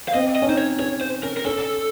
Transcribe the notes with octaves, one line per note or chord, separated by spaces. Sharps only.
F5
C4 D#5
D#5
C#4
D#4 C5
C#5
C#4 C#5
C5
C#4 A#4
A#4
C#4 A4